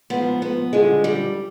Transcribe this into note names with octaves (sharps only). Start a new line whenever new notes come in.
G#2 F3 B3
B3
G2 D3 F3 G#3
G3